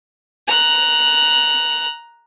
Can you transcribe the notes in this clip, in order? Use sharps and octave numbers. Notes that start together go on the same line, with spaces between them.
A#5 F#6